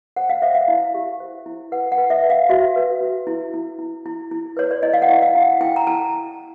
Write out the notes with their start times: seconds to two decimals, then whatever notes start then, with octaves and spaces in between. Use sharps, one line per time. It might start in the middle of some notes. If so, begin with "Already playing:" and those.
0.16 C5 F#5
0.30 F5
0.42 C5 E5
0.55 F5
0.68 E4
0.94 G4
1.20 C5
1.46 E4
1.72 B4 F#5
1.92 F#5
1.98 B4
2.10 E5
2.23 B4
2.30 F5
2.49 F#4 E5
2.76 B4
3.01 F#4
3.27 E4
3.54 E4
3.79 E4
4.06 E4
4.31 E4
4.57 B4 C#5
4.71 D5
4.83 E4 D#5
4.93 F5
5.02 F#5
5.09 E4
5.22 F5
5.35 E4
5.42 F#5
5.61 E4 G5
5.76 A#5
5.87 E4 A5